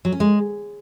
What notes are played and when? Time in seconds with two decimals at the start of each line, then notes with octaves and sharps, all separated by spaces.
0.05 F#3
0.12 C#4
0.20 G#3